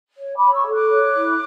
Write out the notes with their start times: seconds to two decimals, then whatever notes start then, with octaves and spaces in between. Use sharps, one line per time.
0.18 C#5
0.36 B5 D6
0.43 C#5
0.54 C#6 E6
0.66 A4
0.72 D6 F#6
0.90 C#5
1.15 E4